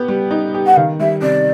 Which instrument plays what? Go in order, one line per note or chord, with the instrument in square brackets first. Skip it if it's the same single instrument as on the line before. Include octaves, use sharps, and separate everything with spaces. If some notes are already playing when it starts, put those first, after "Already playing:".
Already playing: [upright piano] B3 G4
G3
D#4
G4
[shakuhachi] F#5
[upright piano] D#3 [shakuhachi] F5
[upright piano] G3 [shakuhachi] E5
[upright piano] C3 [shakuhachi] D5